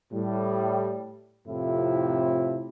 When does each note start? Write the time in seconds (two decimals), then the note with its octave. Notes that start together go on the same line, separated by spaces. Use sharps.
0.13 A2 G3
1.48 F2 A2 C3 E4 F4